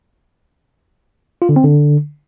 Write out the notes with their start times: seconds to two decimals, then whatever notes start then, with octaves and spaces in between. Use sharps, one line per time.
1.42 F4
1.49 D3
1.56 C4
1.64 D3